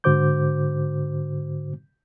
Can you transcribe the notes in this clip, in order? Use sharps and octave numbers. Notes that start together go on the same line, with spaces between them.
G#2 D3 F#4 C5 D6 G6